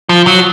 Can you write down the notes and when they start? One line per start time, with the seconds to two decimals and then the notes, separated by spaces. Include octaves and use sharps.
0.09 F3
0.27 F#3